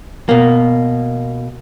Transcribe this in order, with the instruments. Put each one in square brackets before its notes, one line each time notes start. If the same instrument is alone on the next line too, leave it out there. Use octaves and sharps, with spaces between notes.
[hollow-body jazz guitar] B2 A#3